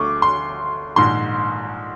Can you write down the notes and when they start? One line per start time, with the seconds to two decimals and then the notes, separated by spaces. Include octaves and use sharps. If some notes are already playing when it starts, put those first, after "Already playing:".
Already playing: D2 D3 C#6 D6
0.22 C6
0.96 A#1 G#2 D#3 C6